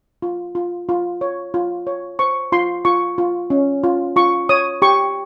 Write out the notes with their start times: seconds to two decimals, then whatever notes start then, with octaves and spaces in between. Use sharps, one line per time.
0.22 F4
0.55 F4
0.89 F4
1.21 C#5
1.54 F4
1.87 C#5
2.19 C5 C#6
2.52 F4 C6
2.85 F4 C#6
3.18 F4
3.50 C#4
3.84 F4
4.16 F4 C#6
4.49 C#5 D#6
4.82 G4 C#6